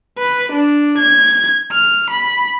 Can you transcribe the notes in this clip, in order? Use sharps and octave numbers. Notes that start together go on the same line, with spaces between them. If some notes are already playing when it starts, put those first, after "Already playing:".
B4
D4
G#6
F6
B5